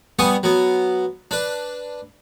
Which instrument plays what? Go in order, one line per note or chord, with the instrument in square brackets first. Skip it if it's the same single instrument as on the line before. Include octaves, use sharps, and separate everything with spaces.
[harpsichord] G3 B3 G#5 C#6 D#6
F#3 B3
D4 B4